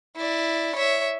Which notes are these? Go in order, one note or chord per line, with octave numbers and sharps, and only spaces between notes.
E4 D5
C#5 E5